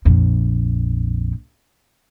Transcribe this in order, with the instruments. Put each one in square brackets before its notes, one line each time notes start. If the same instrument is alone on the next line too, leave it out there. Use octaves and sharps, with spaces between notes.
[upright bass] A#1 F2